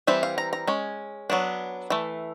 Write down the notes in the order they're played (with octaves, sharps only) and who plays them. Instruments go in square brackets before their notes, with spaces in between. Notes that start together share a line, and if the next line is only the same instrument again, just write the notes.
[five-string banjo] E3 G3 C4 E5
F5
A#5
A#5
G#3 C#4
F#3 B3 D4
E3 A3